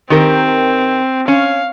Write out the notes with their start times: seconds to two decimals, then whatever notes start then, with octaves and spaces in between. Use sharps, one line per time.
0.10 D#3 C4 G4 A#4
1.28 C#4 F5